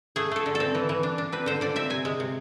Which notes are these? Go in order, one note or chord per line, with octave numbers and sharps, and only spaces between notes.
A3 G#4
A3 A4
D3
A4
C4
E3
E3
D4
D4
C4 B4
D3 C5
D3 D5
C4 E5
C3 G#5
G#3
C3